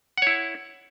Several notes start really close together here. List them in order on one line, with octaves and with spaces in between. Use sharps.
F#5 C#5 E4